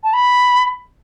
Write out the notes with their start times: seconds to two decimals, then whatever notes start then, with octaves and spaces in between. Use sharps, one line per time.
0.04 A5
0.13 B5